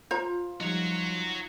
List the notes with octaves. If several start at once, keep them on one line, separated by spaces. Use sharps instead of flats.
F4 C5 A#5
F3 G3 D#4 F#4 C#5